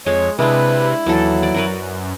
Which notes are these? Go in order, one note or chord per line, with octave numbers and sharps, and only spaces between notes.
F2 G#3 C#5
C3 G#3 D4 E4 B4
D#2 E3 F#3 A4
D5
F#2 F#4 A#4 B4